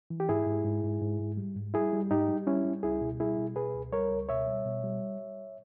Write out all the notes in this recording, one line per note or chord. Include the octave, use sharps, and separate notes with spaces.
E3
G4
G#2 E4 G#4
G#2
G#2
G#2
G#2
G#2
G3
G#2
G3 E4 G#4
G3
G#2 D#4 G4
G3
G3 C#4 E4
G3
C#2 E4 G#4
B2
G3 E4 G#4
B2
B2 G#4 B4
C#2
G3 A#4 C#5
C#2
B2 C#5 E5
G3
B2
G3